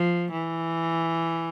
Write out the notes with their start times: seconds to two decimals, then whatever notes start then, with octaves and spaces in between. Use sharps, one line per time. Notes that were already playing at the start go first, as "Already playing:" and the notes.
Already playing: F3
0.32 E3